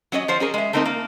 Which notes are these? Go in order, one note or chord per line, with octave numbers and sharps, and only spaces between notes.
F#3 C#4 C#5 D#5
F3 C5 C#5
C#4 G#4 A#4
G#3 E5
A3 A#3 C4 D#4 G4 A#4
A#3